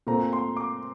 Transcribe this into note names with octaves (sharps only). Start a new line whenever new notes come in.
A#2 A3 C4 A#5
C6
D6